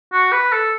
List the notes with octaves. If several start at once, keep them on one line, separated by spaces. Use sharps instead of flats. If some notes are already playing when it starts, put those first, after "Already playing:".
F#4
B4
A4